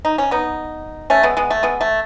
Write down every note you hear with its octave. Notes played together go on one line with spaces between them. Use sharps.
D#4
C#4
B3 D#4
A3 C#4
G#3 B3
G#3 B3
A3
G#3 B3
A3